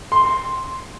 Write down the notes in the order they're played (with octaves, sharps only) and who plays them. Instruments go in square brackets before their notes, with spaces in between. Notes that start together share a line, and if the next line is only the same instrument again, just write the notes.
[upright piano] C6